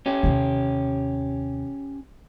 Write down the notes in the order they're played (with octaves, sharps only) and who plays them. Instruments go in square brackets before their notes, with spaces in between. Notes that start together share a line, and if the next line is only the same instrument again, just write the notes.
[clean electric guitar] C#4 G4
[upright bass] D#2 C3